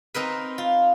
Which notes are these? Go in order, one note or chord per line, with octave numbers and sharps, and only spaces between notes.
C4 D#4 A#4 B4
F4